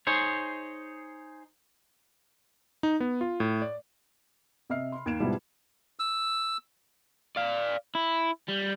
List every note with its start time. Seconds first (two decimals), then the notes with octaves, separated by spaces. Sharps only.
0.07 D#4 G#4 C5 C#5
2.83 D#4
3.00 B3
3.21 F4
3.40 A2
3.62 D5
4.70 C3 D#5 E5 F6 C7
4.92 B5 C6
5.06 D#2 G#6 D7 E7
5.20 G#2 B2 F3 G3 B3 E4
5.99 E6
7.36 D5 F5
7.95 E4
8.48 G3